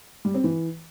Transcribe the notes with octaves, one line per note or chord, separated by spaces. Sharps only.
G3
C4
E3